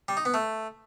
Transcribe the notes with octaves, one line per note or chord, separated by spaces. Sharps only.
G3
D#4
B3
A3